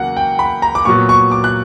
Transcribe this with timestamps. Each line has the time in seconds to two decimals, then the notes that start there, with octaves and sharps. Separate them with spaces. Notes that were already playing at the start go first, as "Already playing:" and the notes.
Already playing: E2 C#3 F#3 A#3 F#5
0.17 G5
0.39 B5
0.62 A#5
0.75 D6
0.85 A#2 F#3 B3 C#6
1.09 C#6
1.31 D6
1.44 F#6